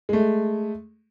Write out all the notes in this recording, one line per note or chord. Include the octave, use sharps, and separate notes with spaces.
G#3 A3